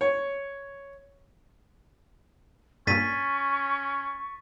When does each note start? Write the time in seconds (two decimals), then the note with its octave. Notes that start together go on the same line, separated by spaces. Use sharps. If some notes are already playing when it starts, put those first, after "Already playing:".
0.01 C#5
2.87 G2 A#2 C#4 C#6 A6 B6 D#7